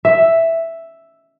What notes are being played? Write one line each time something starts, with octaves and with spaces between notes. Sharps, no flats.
E5